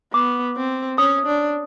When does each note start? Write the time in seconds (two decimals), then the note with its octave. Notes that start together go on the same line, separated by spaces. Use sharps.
0.13 B3 D6
0.57 C4
0.98 C#4 D#6
1.27 D4